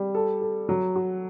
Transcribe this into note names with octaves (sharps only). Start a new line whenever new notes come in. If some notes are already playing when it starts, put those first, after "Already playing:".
Already playing: G3
A4
A4
F#3
F#4